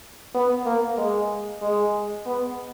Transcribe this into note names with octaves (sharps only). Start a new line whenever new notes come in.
B3
A#3
G#3
G#3
B3